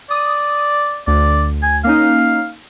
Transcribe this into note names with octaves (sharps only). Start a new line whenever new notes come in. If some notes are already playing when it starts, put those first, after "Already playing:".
D5 D#6
D2 D5
G#5
A#3 C#4 D#4 F5